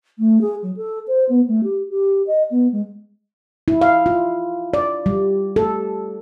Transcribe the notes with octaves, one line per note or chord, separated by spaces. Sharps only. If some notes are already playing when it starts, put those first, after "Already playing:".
A3
G#4
F#3
A4
C5
B3
A3
G4
G4
D#5
B3
G#3
E4
F5
F4
D5
G3
A4